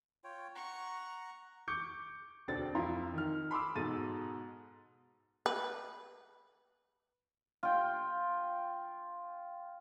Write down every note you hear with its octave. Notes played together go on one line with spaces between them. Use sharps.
F4 C#5 G5
F#5 A#5 C#6
C#6 D6 G6 C#7
E1 D2 C4 D4 A6
F2 E4 F4 A#5 C6
D#3 F6
B5 C6 D6 E6
G#2 B2 A4 A6 D#7
B4
F4 G5